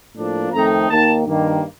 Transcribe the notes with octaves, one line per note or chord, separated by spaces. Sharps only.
A2 F3 A#3 D4
F2 D#3 A3 C4 D#4 A#5
D#2 D#3 A#3 D#4 A5
G2 D#3 A#3